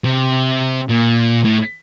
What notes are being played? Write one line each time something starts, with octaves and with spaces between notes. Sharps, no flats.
C3
A#2
A2